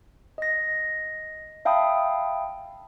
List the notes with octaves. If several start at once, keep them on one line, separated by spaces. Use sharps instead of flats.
D#5 A#6
E5 F5 G5 A5 B5 D#6